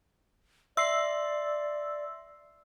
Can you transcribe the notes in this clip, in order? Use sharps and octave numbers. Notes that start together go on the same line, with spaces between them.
D5 E5 C6 E6 C7